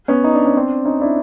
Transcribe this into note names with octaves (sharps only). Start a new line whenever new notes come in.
B3 C#4
D#4
D4
C#4
C4 D4
C#4 D#4
D4 E4